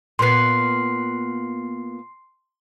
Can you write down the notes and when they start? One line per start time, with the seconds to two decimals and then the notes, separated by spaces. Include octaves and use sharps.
0.19 A#2 B3 C6 C7